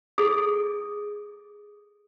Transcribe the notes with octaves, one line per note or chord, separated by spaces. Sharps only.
G#4 A4 D#6